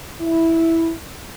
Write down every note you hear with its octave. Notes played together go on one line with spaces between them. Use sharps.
E4